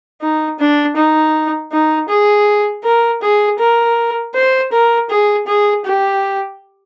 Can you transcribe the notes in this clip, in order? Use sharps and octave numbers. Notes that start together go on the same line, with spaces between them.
D#4
D4
D#4
D#4
G#4
A#4
G#4
A#4
C5
A#4
G#4
G#4
G4